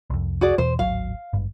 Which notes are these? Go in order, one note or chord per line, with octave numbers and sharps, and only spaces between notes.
C2 F2
F#4 G#4 D5
E2 B2 C5
D1 G#1 F#3 F5
G#1 G2